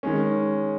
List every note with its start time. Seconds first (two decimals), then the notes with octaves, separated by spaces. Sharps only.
0.03 D#3 G#3 C#4